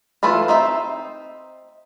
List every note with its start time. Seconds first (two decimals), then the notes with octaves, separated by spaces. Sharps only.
0.23 E3 A3 E4 F4 B4
0.48 C4 D#4 C5 E5